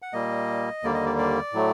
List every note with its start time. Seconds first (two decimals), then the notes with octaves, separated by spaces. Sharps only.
0.02 F#5
0.13 A#2 G3 A#3 D#5
0.83 D#2 D3 G3 A#3 D5
0.94 D#5
1.06 D5
1.18 D5
1.53 A2 F#3 A3